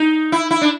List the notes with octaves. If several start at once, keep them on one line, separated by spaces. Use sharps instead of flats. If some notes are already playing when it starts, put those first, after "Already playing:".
Already playing: D#4
E4
E4
D4